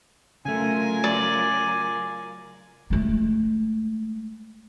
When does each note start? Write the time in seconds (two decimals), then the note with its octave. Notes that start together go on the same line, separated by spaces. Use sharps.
0.45 C#3 F#3 A3 F4 A#4 G#5
1.04 D5
2.90 G#3 A3